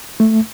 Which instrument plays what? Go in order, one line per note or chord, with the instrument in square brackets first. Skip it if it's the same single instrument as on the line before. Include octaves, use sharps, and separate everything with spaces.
[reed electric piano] A3